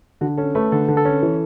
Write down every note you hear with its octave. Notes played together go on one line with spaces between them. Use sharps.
D3 F#4
C#4 A4
A3 B4
D3 A4
D3
A4
C#4
E3